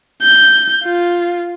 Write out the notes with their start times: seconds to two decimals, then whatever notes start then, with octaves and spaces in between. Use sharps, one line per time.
0.23 G6
0.83 F4